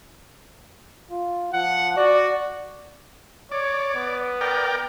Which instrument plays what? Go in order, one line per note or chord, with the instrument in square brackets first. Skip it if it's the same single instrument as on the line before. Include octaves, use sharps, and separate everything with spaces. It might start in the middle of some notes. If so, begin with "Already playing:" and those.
[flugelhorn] F4
[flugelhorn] F3 [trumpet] F#5
[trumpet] F#4 [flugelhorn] D5
[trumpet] C#5 [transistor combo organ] D5
[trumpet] B3
[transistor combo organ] A#4 D5 G5